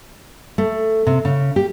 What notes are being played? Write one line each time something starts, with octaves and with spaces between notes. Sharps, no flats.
A3
C3
C#3
G4